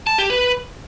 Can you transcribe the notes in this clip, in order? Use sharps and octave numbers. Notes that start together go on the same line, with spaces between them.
A5
G4
B4